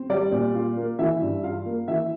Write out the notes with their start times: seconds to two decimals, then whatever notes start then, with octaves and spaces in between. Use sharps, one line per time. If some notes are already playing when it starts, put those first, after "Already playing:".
Already playing: C4
0.10 G3 D5
0.32 A#2
0.55 F4
0.77 A#3
0.99 E3 E5
1.21 G2
1.43 F4 F5
1.66 A#3
1.88 E3 E5